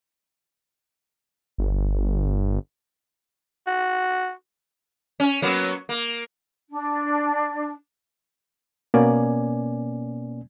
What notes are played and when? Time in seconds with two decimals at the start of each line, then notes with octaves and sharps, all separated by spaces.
1.58 G1
3.67 F#4
5.20 C#4
5.42 F#3 A#3 B3
5.89 A#3
6.71 D4
8.94 B2 A#3 B3 C#4 D5 G#5